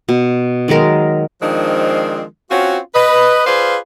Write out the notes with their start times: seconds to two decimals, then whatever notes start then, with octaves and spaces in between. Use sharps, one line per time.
0.09 B2
0.68 D#3 F#3 G#3 A#4
1.42 D#3 F3 G#3 C4 D4 D#4
2.51 C4 C#4 F4 F#4
2.95 B4 D#5
3.46 F4 G#4 B4 C5 D5 F5